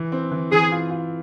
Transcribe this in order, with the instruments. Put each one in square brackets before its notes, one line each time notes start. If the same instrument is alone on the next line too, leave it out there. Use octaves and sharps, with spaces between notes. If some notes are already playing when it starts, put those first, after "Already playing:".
Already playing: [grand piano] E3
C4
E3
[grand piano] E3 [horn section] G#4
[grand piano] F4
F4